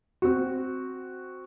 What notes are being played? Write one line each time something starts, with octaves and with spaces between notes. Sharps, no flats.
C4 F#4